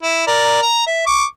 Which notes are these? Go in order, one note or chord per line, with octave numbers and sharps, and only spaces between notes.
E4
A#4 D5
A#5
E5
C#6 D6